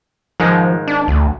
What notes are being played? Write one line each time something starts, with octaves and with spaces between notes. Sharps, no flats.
G#2 D#3 F3 G#3
D4
D2